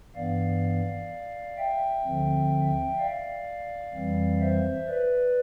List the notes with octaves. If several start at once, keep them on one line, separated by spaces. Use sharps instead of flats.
G2 E3 B3 D5 F5
E5 G5
D2 D3 F3 C4
D5 F5
F2 E3 G3 C4
C5 E5
B4 D5